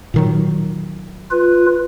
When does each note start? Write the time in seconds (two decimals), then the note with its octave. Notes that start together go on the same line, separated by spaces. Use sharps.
0.14 A#2 D#3 F#3
1.31 F4 B4